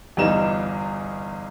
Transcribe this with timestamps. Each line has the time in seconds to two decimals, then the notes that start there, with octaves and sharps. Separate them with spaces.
0.17 G1 E2 G3 D#4 E7